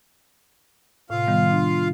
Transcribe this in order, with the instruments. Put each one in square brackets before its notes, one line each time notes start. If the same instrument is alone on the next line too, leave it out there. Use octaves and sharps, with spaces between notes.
[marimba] A2 C3 [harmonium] F4 F5
[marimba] D#3 G3 B3
D4